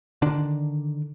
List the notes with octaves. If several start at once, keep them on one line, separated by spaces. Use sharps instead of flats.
D3 D#3 D4